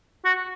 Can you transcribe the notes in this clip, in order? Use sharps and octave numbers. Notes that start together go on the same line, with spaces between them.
F#4